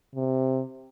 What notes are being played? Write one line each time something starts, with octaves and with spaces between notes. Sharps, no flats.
C3